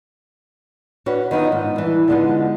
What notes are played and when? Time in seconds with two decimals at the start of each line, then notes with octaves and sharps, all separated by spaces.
1.06 C#4 D4 F#4 B4 C#5
1.31 D#3 B3 D#4 F4 D#5
1.52 G#2
1.76 G2 E3
2.08 D3 F3 G#3 B3 D#4